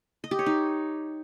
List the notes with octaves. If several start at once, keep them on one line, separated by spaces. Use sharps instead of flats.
D#5
G4
C#5
D#4